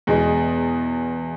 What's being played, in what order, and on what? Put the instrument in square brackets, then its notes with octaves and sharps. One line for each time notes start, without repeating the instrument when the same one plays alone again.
[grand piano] E2 B2 G#3